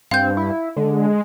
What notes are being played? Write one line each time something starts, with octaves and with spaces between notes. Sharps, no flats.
G2 C4 F5 G6
E4
D3 G#3